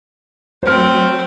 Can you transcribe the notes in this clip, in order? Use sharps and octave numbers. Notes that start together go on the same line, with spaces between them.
F#3 A3 C4 C5 F6